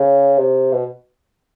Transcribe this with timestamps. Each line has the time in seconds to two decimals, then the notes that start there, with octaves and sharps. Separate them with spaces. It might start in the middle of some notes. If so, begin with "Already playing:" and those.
Already playing: C#3
0.38 C3
0.72 B2